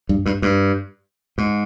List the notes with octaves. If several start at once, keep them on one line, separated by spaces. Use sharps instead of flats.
G2
G2
G2
G#2